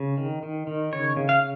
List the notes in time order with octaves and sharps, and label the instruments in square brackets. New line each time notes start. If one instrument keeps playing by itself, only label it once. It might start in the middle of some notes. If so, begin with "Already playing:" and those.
Already playing: [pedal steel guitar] C#3
D#3
D#3
D#3
C#3 C#5
C#3
F5